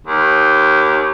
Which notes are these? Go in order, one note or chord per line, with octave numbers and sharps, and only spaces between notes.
D#2